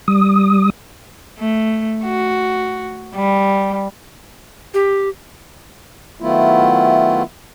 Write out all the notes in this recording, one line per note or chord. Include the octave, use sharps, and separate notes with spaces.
G3 D#6
A3
F#4
G3
G4
D#3 F#3 A3 B3 E4 F4